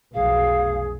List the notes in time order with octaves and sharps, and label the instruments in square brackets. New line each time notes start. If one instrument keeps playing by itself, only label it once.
[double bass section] F1 B1 [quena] G#4 [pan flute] F5